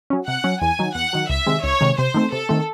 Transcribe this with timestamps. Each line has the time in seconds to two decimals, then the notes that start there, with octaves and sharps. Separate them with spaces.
0.10 F#3 C#4
0.27 C3 F#5
0.44 F#3 C#4
0.62 E2 G#5
0.79 D#3 F#3
0.95 E2 F#5
1.13 D#3 F#3
1.29 C#2 E5
1.47 C3 D#3 G#3
1.63 C#2 C#5
1.81 C3 D#3 G#3
1.97 C3 C5
2.14 D#3 A3 C4
2.32 C3 A4
2.49 D#3 A3 C4